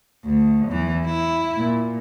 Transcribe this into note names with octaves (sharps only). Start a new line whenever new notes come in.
D2
E2 E3
E4
A#2